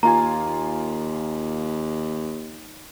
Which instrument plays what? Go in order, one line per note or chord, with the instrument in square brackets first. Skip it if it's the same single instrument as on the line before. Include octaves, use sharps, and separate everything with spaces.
[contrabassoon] D#2 [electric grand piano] A#3 F4 G#5 [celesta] A#5